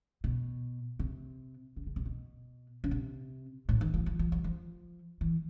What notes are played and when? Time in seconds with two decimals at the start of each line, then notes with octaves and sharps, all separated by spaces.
0.24 B2
0.99 C3
1.76 C#3
1.87 C#3
1.96 C3
2.06 B2
2.84 C#3
2.91 C3
3.69 A2
3.81 D#3
3.94 F3
4.06 F3
4.19 F3
4.32 F#3
4.44 F3
5.21 E3